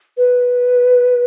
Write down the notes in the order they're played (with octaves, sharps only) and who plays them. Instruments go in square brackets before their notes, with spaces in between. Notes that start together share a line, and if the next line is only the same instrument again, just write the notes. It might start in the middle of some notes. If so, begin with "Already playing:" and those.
[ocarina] B4